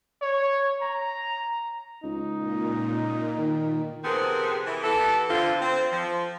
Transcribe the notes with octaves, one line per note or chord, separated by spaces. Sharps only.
C#5
A#5
C#2 D#4
A#2
D#3
C3 F3 B3 C4 G#4 A#4
E3
E3 B3 G4 A4
D3 C4 F4
C4
F3